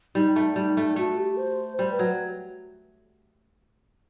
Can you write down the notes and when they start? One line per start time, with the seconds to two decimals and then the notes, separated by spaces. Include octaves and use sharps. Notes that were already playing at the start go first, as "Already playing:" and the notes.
0.15 G3 D#4
0.36 A3
0.56 G3
0.77 A3
0.96 A3 F#4
1.17 G4
1.37 C5
1.78 G3 C5
1.91 B4
1.99 F#3